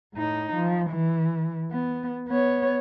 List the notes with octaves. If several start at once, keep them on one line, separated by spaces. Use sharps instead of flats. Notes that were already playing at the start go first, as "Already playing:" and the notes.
A2 D#4
F3
E3
B3
B3 C#5